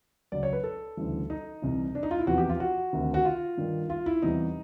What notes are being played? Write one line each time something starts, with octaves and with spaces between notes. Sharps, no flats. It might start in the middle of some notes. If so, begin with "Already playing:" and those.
C#2 C#3 F#3 D5
C#5
B4
A4
D2 C#3 E3 G3
D#4
C2 C3 E3 G3
D4
D#4
F4
E4
E2 C3 F3 F#4
G4
F4
F#4
D2 C3 D#3
F#4
F4
G2 D#3 G3
F4
E4
E2 C3 E3 G3 D#4